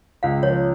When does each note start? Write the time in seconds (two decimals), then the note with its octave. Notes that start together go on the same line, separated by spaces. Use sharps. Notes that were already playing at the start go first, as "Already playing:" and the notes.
0.23 C#2 F5
0.43 F3 C#5